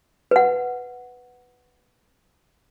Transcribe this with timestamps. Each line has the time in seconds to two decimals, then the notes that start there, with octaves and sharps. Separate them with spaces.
0.31 B4 F#5